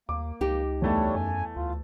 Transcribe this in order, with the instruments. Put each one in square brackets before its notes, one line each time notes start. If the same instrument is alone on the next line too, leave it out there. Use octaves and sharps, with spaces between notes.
[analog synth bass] D#2 [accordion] A#3 [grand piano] D6
[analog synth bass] C#2 [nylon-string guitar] D#4 G4
[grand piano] E2 A3 A5 [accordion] G3 D4 C#5
[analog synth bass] D2
[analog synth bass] F#2 [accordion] G#5
[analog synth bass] D2 [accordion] F4